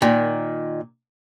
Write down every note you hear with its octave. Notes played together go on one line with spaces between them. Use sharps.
A#2 D#3